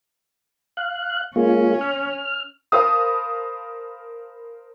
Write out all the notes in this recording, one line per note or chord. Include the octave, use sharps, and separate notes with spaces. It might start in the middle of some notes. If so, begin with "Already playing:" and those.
F5 F#6
G#3 A#3 C#4 F4
F6
A#4 C5 F5 A5 B5 D#6